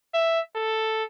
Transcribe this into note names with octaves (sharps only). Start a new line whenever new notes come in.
E5
A4